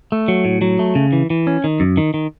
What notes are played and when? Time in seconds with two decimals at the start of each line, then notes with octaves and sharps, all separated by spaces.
0.12 A3
0.28 F#3
0.45 A2
0.62 F#3
0.79 A3
0.95 C#3
1.13 E3
1.30 E3
1.47 C#4
1.64 D#3
1.80 F#2
1.97 D#3
2.14 D#3